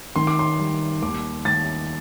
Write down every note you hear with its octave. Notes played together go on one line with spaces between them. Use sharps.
D#3 C6
D6
C6
G3
D#2 D6
D#2 A6